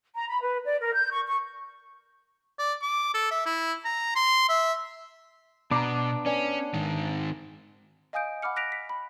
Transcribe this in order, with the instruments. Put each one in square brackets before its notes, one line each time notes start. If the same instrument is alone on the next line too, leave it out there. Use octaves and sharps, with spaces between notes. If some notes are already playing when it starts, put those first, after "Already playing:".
[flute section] A#5
B5
B4
D5
A#4
G6
C#6
C#6
[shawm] D5
D6
A4
E5
E4
A#5
C6
E5
[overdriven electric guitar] B2 [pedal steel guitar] B3 D4 [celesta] A#5 D6
[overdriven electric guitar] C#4 [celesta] B4 D5 G#5
[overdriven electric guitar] G#2 D#3
[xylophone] D#5 F5 G#5 D#6 G6 D7
F#5 B5 D6 F6 C#7
F#6 A#6 B6 D7 F7
B6
B5